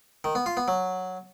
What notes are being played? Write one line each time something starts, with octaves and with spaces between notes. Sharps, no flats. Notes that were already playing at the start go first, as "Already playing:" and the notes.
D#3
B3
F4
B3
F#3